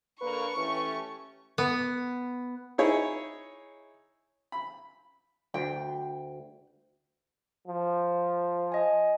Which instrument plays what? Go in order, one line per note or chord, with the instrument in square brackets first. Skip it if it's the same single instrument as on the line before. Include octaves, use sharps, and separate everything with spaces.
[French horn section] D3 A#3 [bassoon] B4 [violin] C#6
[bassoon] E3 [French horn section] A3 C#4 G4
[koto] B3
[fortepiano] D#4 E4 G#4 C#5
B5
[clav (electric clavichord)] D2 [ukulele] G5
[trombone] F3
[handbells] D#5 G#5